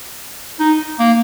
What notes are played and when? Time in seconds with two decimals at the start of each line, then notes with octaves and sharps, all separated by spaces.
0.59 D#4
0.99 A#3